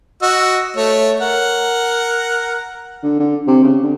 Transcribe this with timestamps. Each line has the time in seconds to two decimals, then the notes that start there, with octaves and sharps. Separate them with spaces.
0.22 F#4 D#5 E6
0.77 A3 C#5
1.20 A#4 F#5
3.03 D3
3.20 D3
3.47 C3
3.64 C#3
3.83 D3